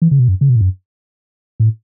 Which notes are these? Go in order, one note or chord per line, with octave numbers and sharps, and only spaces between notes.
E3
C#3
B2
F#2
C#3
B2
A2
F#2
A2